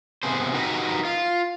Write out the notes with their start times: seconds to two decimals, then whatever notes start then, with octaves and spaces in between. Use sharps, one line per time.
0.23 C3 B3 G#4 C5
0.53 D#4 F#4 G4 A#4 B4 D#5
1.05 F4